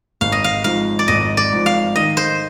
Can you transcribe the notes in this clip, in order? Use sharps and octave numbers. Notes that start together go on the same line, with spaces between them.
G#1 F5
D#5
F5
G#2 F3 F5
D5
G#1 D#5
D5
G#2 F3
F5
D#3 D#5
C5